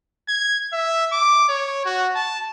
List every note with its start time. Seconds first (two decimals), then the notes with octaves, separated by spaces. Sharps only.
0.28 G#6
0.73 E5
1.12 D6
1.49 C#5
1.85 F#4
2.15 A5